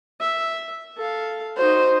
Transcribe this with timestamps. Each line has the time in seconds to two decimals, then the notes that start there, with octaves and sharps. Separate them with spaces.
0.20 E5
0.97 A4 F5
1.57 D#4 F#4 C5